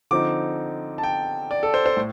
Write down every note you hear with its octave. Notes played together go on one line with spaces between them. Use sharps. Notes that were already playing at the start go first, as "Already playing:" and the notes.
D3 F3 C4 D#4 D6
A5
G5
D5
A4
C5
C5
A2